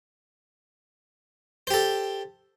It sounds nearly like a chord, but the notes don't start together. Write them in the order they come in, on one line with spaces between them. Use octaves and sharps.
C5 G4 A4